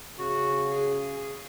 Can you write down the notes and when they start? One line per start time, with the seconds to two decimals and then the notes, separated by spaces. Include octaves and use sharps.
0.19 C#3 F#4
0.71 G#4